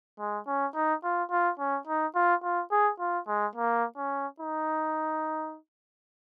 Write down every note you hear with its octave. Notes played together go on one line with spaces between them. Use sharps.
G#3
C#4
D#4
F4
F4
C#4
D#4
F4
F4
G#4
F4
G#3
A#3
C#4
D#4